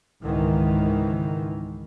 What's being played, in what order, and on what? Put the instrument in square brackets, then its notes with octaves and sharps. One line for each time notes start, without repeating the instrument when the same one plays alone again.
[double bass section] C#2 G#2 D#3 E3